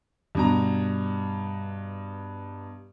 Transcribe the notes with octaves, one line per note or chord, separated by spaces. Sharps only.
G2 B2 A#5